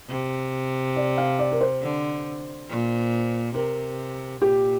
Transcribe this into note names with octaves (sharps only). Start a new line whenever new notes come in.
C3
D5
F5
D5
A#4
C5
D3
A#2
C3 A#4
A#2 G4